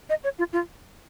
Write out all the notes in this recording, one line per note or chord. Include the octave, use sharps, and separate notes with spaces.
D#5
C#5
F4
F4